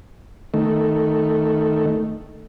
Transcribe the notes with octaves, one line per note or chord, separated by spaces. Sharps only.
D#3 A3